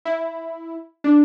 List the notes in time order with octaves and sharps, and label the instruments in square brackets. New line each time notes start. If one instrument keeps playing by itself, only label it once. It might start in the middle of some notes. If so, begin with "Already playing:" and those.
[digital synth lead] E4
D4